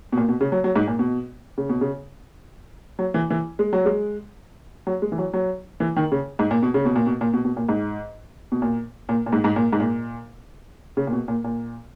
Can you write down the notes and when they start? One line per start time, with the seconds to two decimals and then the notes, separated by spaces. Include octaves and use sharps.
0.12 B2
0.17 A#2
0.29 B2
0.41 C#3
0.52 F#3
0.64 F#3
0.76 G#2
0.87 A#2
0.99 B2
1.58 C#3
1.69 B2
1.81 C#3
2.99 F#3
3.14 E3
3.30 E3
3.59 G#3
3.73 F#3
3.85 G#3
4.87 F#3
5.02 G#3
5.12 E3
5.18 F#3
5.33 F#3
5.80 E3
5.96 D#3
6.12 C#3
6.39 G#2
6.51 A#2
6.63 B2
6.74 C#3
6.85 B2
6.95 A#2
7.07 B2
7.21 A#2
7.33 B2
7.45 B2
7.57 A#2
7.69 G#2
8.52 B2
8.62 A#2
9.09 A#2
9.26 A#2
9.32 G#2
9.44 G#2
9.56 A#2
9.73 G#2
9.80 A#2
10.97 C#3
11.07 A#2
11.13 B2
11.28 A#2
11.44 A#2